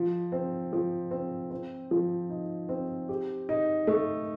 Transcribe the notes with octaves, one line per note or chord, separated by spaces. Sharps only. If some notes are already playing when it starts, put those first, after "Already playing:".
Already playing: F3
C4
F3
C4
C4
F3
D#4
C4
G4
D#4
A3